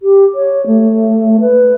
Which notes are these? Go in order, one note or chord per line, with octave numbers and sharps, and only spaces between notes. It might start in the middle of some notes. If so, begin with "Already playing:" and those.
G4
C#5
A3
B4